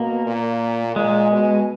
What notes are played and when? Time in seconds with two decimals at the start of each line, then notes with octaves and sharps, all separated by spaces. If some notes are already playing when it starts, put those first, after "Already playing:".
Already playing: B2 A#3
0.27 A#2
0.96 A#2 G#3
1.31 B2